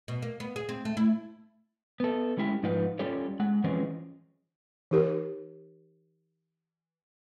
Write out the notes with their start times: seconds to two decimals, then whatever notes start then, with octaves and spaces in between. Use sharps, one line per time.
0.08 B2
0.22 A#3
0.40 B3
0.56 G#4
0.69 C4
0.85 A3
0.97 E4
2.00 B3 A4
2.37 G3 G#3 C#4 E4 G4
2.63 G#2 F3 D#4 F4 B4 F#5
2.99 G3 C#4 F4 G4 A4 C#5
3.40 G#3 F#5
3.64 E3 F3 G#3 C4 C#4
4.91 E3 D#4 G4 A#4